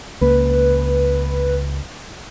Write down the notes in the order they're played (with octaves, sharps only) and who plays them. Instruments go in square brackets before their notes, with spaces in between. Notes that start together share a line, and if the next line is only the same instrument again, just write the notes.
[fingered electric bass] C#2 A#3 [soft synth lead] B4